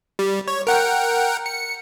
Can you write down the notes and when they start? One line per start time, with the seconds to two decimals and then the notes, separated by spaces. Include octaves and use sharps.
0.19 G3
0.48 C#5
0.67 A#4 F#5 G5
1.46 C#7